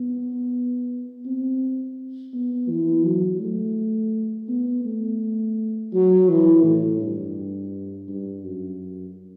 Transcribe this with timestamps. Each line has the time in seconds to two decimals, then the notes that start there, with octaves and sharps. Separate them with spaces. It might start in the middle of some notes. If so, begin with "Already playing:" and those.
Already playing: B3
1.26 C4
2.34 B3
2.70 E3
3.05 F#3
3.41 A3
4.49 B3
4.85 A3
5.93 F#3
6.29 E3
6.64 A2
7.01 G2
8.08 G2
8.44 F#2